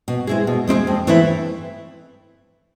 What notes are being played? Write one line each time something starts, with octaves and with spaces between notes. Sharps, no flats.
B2
G#3 C4 E4 G#4
B2
G#3 C4 E4 G#4
F2
E3 A3 C4 E4